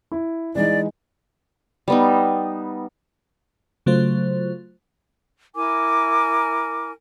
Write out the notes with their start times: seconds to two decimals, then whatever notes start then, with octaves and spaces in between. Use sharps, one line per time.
0.12 E4
0.55 E3 G#3 D#4 D5
1.88 G3 B3 D#4
3.86 C#3 F#3 A3 F4 C5
5.55 E4 A#4 G#5 D6